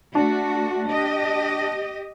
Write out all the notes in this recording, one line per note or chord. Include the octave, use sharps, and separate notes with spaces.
A3 D4 F#4
G4 D#5